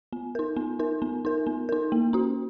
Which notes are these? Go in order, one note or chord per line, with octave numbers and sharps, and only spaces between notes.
B3
D#4 A#4
B3
D#4 A#4
B3
D#4 A#4
B3
D#4 A#4
A#3
C#4 F#4